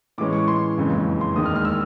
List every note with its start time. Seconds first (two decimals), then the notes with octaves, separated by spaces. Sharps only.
0.18 A2 E3 G#3 C#4 D6
0.33 C#6
0.48 C6
0.77 F#1 F2 C#3 E3 G#3
1.21 C6
1.36 E1 D#2 D#3 G#3 D#6
1.45 F6
1.56 F6
1.65 E6